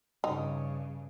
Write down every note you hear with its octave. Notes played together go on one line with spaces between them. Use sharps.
G2 C#3 D#4